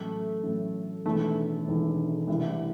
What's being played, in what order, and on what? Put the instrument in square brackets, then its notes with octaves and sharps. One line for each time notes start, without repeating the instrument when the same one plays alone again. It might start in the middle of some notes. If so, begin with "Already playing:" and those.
Already playing: [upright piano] A1 A2 F#3 [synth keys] A3
[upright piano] A1 A2 F#3
[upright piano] E1 E2 D#3 [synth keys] A3
[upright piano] E1 E2 D#3
C2 C3 E3